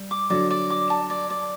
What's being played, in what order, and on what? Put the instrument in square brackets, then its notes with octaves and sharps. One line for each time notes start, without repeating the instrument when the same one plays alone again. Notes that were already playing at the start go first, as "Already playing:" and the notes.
Already playing: [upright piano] G3
[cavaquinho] D6
[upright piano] D3 F#3 [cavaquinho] D5
[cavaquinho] D5
D6
A5
D5
D5